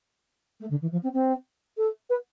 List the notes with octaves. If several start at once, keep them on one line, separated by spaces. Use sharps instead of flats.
A3
D3
E3
F3
C4
C4
A4
B4